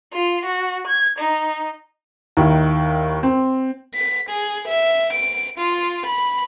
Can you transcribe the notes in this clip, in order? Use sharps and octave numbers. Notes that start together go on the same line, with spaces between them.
F4
F#4
G#6
D#4
D#2 D#3 E4
C4
B6
G#4
E5
D7
F4
B5